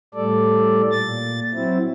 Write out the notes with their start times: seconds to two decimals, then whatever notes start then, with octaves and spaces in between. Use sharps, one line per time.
0.14 A2 G3 A4 D5
0.91 A#2 A6
1.54 F#3 C4 E4